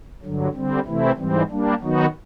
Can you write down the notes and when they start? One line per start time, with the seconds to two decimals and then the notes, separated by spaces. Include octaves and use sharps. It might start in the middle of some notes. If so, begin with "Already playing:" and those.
0.23 G2 D3 F#3
0.54 D3 G3 C4
0.86 C3 E3 A3 C4 E4
1.17 G#2 E3 G3 C4
1.49 G3 A#3 D4
1.81 D#3 F#3 B3 D#4 F#4